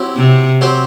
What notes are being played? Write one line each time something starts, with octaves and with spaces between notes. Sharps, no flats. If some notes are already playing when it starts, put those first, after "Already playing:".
Already playing: F#3 C4 E4 G4
C3
F#3 C4 G4 C5